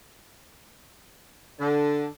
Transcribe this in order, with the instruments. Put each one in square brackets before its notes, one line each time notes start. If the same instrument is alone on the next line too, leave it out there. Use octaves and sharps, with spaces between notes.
[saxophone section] D3